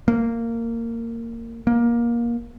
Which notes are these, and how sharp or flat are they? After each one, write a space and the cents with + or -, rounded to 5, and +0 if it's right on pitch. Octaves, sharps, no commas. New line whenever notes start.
A#3 -15
A#3 +20